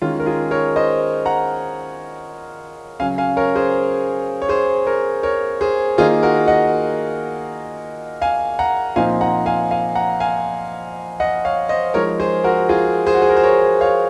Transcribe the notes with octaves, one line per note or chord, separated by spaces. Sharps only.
D#3 G#3 C#4 F4
A#4
F4 G#4
A#4 C#5
C5 D#5
F#5 A#5
C#3 F#3 C#4 F5 G#5
F5 G#5
A#4 C#5
G#4 C5
C#5
G#4 C5
A#4 C#5
A#4 C#5
G#4 C5
D#3 A#3 D#4 F4 G#4
F#4 A#4
D#5 F#5
F5 G#5
F#5 A#5
A#2 F3 C4 D#4 F5 G#5
F#5 A#5
F5 G#5
F5 G#5
F#5 A#5
F5 G#5
D#5 F#5
C#5 F5
C5 D#5
F3 G#3 D#4 A#4 C#5
G#4 C5
F#4 A#4
F4 G#4
G#4 C5
F#4
G#4
A#4
C5
A#4 C#5
C#5 F5